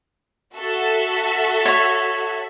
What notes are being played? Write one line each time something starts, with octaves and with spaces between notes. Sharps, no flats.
F#4 A4 E5
C#5